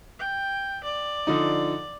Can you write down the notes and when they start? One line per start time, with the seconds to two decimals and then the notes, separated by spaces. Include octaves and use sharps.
0.19 G5
0.84 D5
1.27 D3 F3 D#4